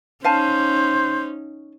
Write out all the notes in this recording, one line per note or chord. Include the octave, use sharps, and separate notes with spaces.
C#4 D#4 C5 F5 G#5 A5